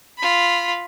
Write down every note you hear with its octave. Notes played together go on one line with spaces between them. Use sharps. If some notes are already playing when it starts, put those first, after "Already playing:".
F4 B5